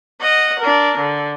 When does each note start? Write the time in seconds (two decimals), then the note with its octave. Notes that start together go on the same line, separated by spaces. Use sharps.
0.21 D#5 F#5
0.59 D4 A#4
0.98 D3